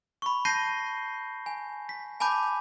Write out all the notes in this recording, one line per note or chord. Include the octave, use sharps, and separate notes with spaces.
B5 C#6
A5 G6 A#6 C7 D#7 G7
G#5
B6
G#5 A5 B5 D6 G6